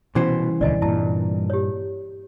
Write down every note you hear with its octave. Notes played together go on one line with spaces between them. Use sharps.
C2 B2 E3 C#4 C5
D#1 C#2 D3 D5 D#5 G#5
G2 A#2 E4 A5
G4 C#5